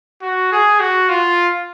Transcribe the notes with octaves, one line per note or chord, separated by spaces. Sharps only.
F#4
G#4
F#4
F4